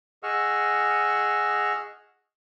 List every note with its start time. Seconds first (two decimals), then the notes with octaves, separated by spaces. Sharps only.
0.23 G#4 D#5 F#5 C#6 E6 F6